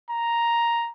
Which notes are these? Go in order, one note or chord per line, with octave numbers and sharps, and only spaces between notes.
A#5